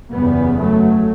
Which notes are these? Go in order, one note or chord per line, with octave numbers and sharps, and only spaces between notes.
F#1 E2 C#3 G3 B3
F#3 A3